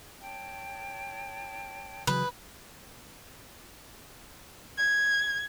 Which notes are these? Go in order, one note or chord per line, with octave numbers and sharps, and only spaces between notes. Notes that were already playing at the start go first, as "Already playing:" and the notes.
C#5 G5 A5
C#3 E3 F#3 G#4 B4 D#6 G6
G#6